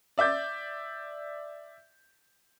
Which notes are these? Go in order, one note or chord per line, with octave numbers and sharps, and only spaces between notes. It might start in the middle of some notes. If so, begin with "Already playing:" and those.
D5 E5 D6 G6 A6